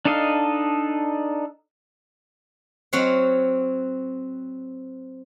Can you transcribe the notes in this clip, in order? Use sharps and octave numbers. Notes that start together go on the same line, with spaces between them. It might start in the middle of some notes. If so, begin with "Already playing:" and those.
D4 D#4 A4 D#5 F5
F#3 C4 C#5 F5 F#5